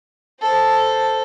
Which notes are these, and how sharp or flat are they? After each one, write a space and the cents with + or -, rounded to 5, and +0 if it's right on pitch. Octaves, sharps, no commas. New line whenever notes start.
A4 +0 C5 +0